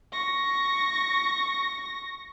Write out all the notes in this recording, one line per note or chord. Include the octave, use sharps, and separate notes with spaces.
C#6 A#6